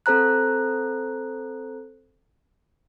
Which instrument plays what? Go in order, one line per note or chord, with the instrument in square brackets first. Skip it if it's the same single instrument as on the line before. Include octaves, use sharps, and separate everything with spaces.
[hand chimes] C4 A4 C5 A#5 F#6